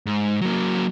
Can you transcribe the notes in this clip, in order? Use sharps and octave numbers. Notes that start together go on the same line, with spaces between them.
G#2
F#3 A#3